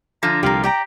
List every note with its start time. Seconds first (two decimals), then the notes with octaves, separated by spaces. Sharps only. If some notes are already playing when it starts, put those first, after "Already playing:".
0.23 D3 F3 A#5
0.43 C2 C3 G4 A#4 F5
0.63 G4 D5 G5 A#5